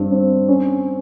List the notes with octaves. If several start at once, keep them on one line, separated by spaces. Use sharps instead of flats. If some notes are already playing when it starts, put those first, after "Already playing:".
Already playing: G2 C4
C4
C#4